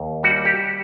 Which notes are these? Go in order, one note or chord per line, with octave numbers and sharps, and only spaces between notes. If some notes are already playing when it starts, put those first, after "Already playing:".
Already playing: D#2
G3 F#4
G4